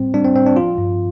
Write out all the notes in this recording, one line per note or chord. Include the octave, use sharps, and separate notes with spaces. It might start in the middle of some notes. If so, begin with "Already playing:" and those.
Already playing: A2 G3 C4
G3 D4
C4
A2 C4
D4
F3 F4
G2